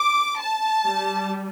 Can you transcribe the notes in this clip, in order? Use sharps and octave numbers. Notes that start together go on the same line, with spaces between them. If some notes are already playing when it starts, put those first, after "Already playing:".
Already playing: D6
A5
G3